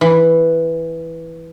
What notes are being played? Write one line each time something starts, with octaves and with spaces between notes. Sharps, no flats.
E3